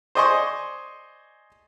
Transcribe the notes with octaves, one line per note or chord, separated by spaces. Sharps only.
C5 D5 D#5 G#5 C6 C#6